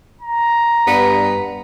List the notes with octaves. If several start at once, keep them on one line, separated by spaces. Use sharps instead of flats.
A#5
G2 B3